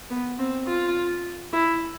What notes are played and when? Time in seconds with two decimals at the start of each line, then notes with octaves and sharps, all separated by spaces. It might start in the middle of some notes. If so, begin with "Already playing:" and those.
0.10 B3
0.39 C4
0.67 F4
1.53 E4